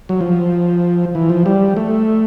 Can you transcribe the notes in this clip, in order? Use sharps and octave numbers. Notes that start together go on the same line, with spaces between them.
F#3
F3
E3
F3
G3
A3